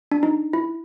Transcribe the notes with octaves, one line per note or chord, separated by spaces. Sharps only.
D4
D#4
E4